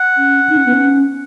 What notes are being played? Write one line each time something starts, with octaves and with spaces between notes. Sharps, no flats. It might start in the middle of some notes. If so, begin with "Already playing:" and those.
Already playing: F#5
C#4
D#4
C#4
B3
C#4